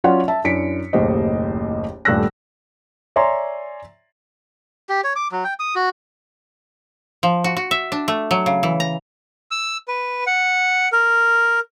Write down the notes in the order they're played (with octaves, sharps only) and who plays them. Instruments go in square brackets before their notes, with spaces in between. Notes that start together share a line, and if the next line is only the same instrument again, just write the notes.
[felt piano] F#3 C#4 F4 C#5 D5 F#5
E5 A5
F#2 D4 E4 B6 C#7 D7
F#1 D#2 A2 G4 C5 D#5
D#1 G2 A3 E6 F#6 A#6
[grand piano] C#5 D5 E5 G#5 A#5 C6
[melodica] G4
C#5
D6
F#3
G5
D#6
F#4
[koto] F3
F#4
F#4
E5
D4
A3
F#3
C#3
E3
A#5
[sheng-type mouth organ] E6
B4
F#5
A#4